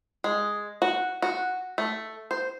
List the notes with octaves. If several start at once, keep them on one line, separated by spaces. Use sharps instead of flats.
G#3
F#4
F#4
A3
C5